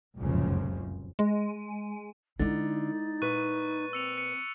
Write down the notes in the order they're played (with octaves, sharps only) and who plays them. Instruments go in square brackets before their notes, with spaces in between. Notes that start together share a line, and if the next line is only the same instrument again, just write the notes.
[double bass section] F1 C#2 F#2 A#2 C#3 F3
[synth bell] G#3
[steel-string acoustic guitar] D3 [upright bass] G#3 E4 [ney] D#4 [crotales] A6
[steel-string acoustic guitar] A#2 B4 [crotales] C#6 F#6 D#7
[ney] C4 [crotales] E6 C#7 F7
[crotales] C#7 D#7